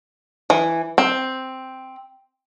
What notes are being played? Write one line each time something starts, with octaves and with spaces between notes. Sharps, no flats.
E3
C4